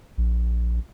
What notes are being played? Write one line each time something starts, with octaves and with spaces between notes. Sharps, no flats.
A#1